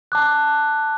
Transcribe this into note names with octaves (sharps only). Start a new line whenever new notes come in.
A5 D6 F#6